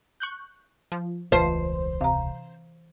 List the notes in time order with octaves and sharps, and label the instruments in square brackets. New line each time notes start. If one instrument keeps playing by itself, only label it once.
[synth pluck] C#6 F#6 G6
F3
[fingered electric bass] E1 C#2 [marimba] E3 B4 A5 [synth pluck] F4 [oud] C5
[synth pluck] C3 [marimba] F5 A#5